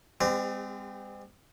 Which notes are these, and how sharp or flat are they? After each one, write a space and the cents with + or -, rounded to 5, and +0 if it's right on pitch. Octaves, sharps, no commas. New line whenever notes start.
G#3 -40 C4 -30 G4 +25